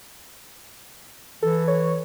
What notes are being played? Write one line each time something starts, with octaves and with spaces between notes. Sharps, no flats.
E3 A4
C#5